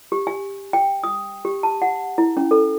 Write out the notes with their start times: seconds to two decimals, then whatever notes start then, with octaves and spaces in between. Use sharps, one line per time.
0.12 G4
0.27 G#5
0.73 G5
1.04 D#6
1.45 G4
1.63 A5
1.82 F#5
2.18 E4
2.37 C#4
2.51 A4